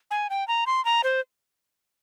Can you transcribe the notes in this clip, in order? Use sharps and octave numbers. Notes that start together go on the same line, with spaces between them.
G#5
G5
A#5
C6
A#5
C5